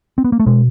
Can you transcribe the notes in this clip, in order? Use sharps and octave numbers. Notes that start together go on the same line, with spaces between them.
C4
B3
A#3
A3
B2 G#3